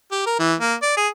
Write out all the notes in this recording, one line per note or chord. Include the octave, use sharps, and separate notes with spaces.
G4
A#4
E3
A#3
D5
G#4